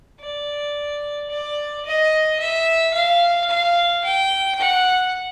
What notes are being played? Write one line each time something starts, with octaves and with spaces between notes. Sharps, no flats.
D5
D5
D#5
E5
F5
F5
G5
F#5